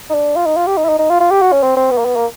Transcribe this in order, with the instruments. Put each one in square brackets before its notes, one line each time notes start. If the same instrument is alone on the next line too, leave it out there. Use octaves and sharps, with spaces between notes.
[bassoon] D#4
D4
F4
D#4
F4
G4
D#4
E4
D#4
D#4
F4
F4
G4
F#4
C#4
C4
C4
B3
A#3
B3
A#3